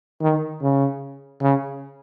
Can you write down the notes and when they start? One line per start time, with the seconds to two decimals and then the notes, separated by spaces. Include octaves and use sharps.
0.22 D#3
0.62 C#3
1.42 C#3